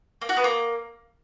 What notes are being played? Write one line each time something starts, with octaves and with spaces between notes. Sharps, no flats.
A#3
F#4
B3
A#3